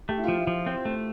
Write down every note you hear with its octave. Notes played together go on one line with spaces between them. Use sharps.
A3 G4
E4
F3 F4
E4
F3
C4 C5
A3